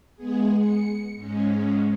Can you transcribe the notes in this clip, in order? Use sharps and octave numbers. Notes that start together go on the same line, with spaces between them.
G#3 B3 G#4
C#7
G#2 G#3 C#4